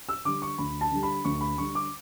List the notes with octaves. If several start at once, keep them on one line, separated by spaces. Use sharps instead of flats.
E6
D3 G3 D6
C#6
D2 B5
A5
D3 G3
B5
D2 C#6
B5
D3 G3 C#6
D6